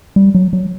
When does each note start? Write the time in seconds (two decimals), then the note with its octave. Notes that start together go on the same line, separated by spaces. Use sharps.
0.16 G3
0.35 F#3
0.53 F#3